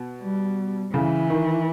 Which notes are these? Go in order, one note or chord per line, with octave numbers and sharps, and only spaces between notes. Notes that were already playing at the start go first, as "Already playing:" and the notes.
Already playing: B2
G3
C#3 E3
D#3